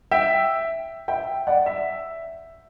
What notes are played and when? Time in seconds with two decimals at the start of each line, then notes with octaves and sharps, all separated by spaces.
0.11 E5 G5
1.08 E5 G5
1.47 D5 F#5
1.66 E5